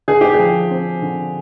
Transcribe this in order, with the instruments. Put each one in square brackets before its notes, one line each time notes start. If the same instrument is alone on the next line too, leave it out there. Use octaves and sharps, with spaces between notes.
[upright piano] D3 G#4
G4
G#4
F3
C4
D3